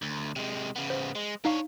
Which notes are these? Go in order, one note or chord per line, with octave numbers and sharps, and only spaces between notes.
D2
C3 G#3
C#3 B3
C5
G#3
D4 D#4 C#5 F5